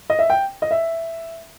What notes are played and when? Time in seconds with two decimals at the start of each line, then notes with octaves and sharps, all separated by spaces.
0.10 D#5
0.19 E5
0.30 G5
0.62 D#5
0.71 E5